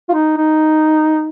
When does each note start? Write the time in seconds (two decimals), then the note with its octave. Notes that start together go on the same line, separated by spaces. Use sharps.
0.09 F4
0.14 D#4
0.37 D#4